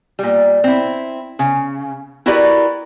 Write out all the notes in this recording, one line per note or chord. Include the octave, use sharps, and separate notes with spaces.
A#2 G3
C4 E4
C#3
E4 F#4 G4 A#4 B4 D5